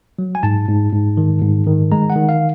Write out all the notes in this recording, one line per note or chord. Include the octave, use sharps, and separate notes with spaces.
F#3
G#5
G#2 A5
G#2
G#2
D#3
G#2
D#3
G#3 A#5
F#5
D#3
F5